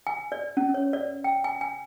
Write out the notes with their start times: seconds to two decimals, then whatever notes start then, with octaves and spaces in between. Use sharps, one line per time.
0.07 G#5
0.32 D5
0.57 C#4
0.74 C#5
0.93 D5
1.24 G5
1.44 G#5
1.61 G#5